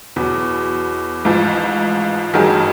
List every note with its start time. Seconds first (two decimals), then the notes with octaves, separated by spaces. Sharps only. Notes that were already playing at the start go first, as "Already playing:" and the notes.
0.16 E2 B2 F#3
1.25 A1 G#2 F3
2.34 A1 G2 D#3 F#3 F#4 G#4